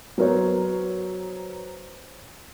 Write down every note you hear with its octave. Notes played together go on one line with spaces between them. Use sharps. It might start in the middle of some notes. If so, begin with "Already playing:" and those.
F#3 B3 A#4 C5 C#5